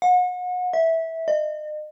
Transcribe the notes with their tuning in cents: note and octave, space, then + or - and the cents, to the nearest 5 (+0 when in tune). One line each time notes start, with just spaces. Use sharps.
F#5 -35
E5 -15
D#5 -40